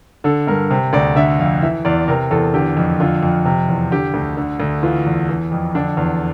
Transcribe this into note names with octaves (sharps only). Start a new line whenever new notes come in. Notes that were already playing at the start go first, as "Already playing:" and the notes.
D3 A4
G2 A#4
C3 C5
D2 D5
D3 E5
F2 F5
E3 E5
E2 D5
C3 A#4
E2 A4
D3 G4
F2
D3 F4
F2
C3
E2
D3 G4
D2
D3
D2
E3 F4
E2
E3
F2
D3 D4
E2